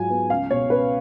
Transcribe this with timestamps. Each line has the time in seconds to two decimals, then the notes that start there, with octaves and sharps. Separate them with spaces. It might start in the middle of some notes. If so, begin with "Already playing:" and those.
Already playing: G#2 F#3 F4 G#5
0.10 B3
0.30 C#2 F5
0.50 B2 C#5
0.70 C#4 B4